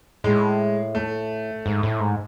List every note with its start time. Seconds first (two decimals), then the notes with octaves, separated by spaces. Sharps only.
0.24 A2 G#3
0.95 A3
1.66 G#2
1.83 A2
2.00 G#2